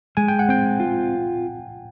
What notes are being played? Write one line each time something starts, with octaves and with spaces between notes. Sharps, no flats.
G#3 G#5
G5
F#5
C4 G5
F4